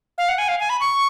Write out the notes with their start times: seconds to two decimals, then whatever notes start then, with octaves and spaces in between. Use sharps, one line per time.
0.18 F5
0.29 F#5
0.38 G#5
0.48 F5
0.60 G#5
0.70 B5
0.80 C#6